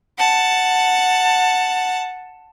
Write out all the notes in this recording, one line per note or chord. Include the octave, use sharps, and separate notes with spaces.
F#5 A5